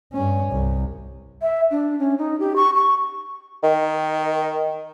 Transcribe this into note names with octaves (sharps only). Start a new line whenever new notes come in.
G2 C#4
C2
E5
D4
C#4
D#4
G4
C#6
C#6
D#3